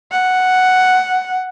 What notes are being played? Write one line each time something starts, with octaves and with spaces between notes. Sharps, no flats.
F#5